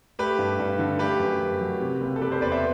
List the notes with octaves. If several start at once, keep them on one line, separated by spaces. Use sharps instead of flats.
A3 G4 B4
G2
G2
D3
A3 G4 B4
F#2
F#2
F#3
C3
F#1
A4
F#1 G4 B4
A4 C5
E2 B4 D5
C5 E5